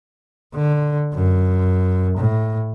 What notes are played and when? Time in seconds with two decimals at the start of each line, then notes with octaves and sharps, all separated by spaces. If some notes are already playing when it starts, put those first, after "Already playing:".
0.54 D3
1.13 F#2
2.18 A2